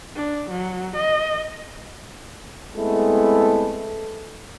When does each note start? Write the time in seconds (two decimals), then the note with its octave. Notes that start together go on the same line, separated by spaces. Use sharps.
0.16 D4
0.50 F#3
0.96 D#5
2.75 G#3 A3 B3 C4 E4 A4